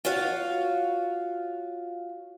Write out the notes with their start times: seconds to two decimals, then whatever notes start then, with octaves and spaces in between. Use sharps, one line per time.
0.05 F4 F#4 C#5 F5